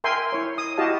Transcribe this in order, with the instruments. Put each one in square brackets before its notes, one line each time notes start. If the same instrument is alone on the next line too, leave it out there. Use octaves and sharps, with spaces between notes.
[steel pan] A#4 E5 G5 G#5 C6
E4 C#5
D#6
E4 F#4 G4 D#5 F5 A5